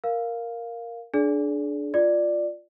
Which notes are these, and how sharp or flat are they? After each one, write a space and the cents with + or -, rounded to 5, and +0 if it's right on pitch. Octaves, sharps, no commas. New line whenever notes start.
A#4 +0 F5 +0
D4 +0 G#4 +35 D5 -25
F4 +0 D5 +10